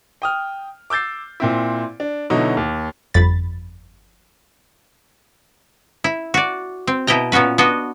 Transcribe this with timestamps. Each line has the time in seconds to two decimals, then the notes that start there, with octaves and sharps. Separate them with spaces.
0.22 G5 D#6 F6
0.90 D6 E6 G6 A6 C7
1.40 A#2 C4 E4
2.00 D4
2.30 B2 D3 F#3 D#4 E4
2.57 D#2
3.14 G1 F2 B5 A6
6.04 E4
6.34 F#4 D5
6.87 C4
7.07 B2 E4 D#5 G5 A#5
7.32 A#2 B3 C#4 F#4 B4
7.58 B3 D4 F#4 D#5